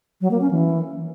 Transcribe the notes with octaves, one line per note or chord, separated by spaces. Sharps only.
F#3
A#3
C#4
E3